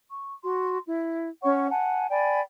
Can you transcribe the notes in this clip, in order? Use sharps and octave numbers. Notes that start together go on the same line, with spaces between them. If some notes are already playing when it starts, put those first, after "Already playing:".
C#6
F#4 C6
E4
C#4 C#5 F#5 C#6
F#5 G#5 A5
D5 G5 G#5 B5